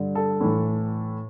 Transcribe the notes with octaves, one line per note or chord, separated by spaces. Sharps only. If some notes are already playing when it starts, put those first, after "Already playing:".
Already playing: G2 D3
A4
A2 E3